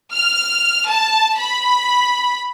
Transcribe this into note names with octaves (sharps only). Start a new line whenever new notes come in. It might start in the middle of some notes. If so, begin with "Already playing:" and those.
F6
A5
B5